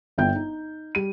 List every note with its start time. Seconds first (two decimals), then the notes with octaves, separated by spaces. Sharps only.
0.18 G1 E5 G5 G6
0.35 D#4
0.95 G3 D#7